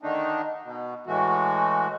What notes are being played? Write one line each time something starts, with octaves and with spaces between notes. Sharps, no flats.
D3 D#3 A3 D4 D#4
B2
A2 E3 G#3 A3 F#4